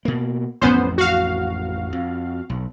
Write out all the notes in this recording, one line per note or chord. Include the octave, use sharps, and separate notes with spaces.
B2 A#3
A1 F2 B3 C#4 C5
F#4 F5
F2
B1